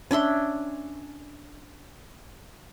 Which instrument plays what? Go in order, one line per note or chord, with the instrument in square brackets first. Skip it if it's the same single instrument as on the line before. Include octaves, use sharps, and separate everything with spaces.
[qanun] C#4 D4 E5 C6